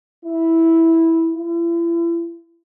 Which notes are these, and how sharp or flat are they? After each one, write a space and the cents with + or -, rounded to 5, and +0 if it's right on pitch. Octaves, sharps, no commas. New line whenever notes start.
E4 -10
E4 +40